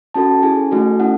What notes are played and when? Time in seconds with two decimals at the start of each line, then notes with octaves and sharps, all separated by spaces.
0.14 C#4 F#4 A4 A5
0.43 C#4 E4 G#4 G#5
0.71 A3 D#4 F#4 A4
1.00 C#4 E4 A4 F#5